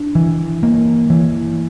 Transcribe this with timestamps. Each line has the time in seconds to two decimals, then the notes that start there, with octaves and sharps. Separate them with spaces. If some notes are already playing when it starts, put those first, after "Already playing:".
Already playing: D4
0.15 E3
0.63 A#3
1.10 E3